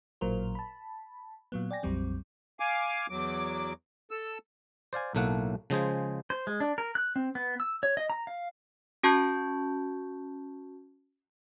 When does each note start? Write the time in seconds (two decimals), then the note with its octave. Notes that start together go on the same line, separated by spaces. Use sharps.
0.21 A1 A#2 F#3 A#4 C5
0.55 A5 B5
1.52 A#2 F#3 B3
1.71 D5 G5 G#5 A#6
1.83 A#1 F2 F#3 G3 C4
2.60 F5 G#5 D6
3.10 E2 F#3 D6
4.11 A4 E6
4.93 C5 D5 F5 G#5
5.15 B1 A2 A3 A#3 F#5
5.70 C#3 F3 G#3 G#4 C5
6.30 C5
6.47 G#3
6.60 D4
6.78 A#4
6.95 F#6
7.16 C4
7.35 B3
7.60 E6
7.83 C#5
7.97 D#5
8.10 A#5
8.27 F5
9.03 C#4 F#4 A5 C#6 G6 G#6